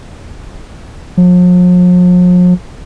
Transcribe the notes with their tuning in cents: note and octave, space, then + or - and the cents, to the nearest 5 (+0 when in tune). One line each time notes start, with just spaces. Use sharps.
F3 +45